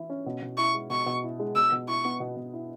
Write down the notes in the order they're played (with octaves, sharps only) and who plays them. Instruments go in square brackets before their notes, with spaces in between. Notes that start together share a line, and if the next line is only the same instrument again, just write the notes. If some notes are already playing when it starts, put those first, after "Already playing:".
Already playing: [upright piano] E3 E4
C#4
B2
B2
[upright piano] E4 [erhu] C#6
[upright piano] G#3
[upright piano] B2 [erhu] C#6
[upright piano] B2
E4
G#3
[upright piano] B2 [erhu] E6
[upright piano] B2
[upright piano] E4 [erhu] C#6
[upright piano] B3
B2
B2
E4